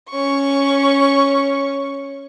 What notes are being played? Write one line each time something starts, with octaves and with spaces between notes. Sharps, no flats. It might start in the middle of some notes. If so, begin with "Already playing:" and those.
C#4 C#6